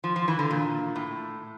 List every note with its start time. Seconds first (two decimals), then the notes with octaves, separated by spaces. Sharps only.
0.04 F3
0.16 F3
0.28 E3
0.39 D3
0.51 A#2
0.96 A2